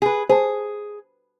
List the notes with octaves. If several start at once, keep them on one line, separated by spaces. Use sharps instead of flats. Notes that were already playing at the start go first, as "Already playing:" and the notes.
G#4 B4
G#4 C5 A5